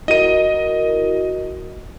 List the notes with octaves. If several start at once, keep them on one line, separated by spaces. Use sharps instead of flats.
E4 F#4 A#4 D#5 D#7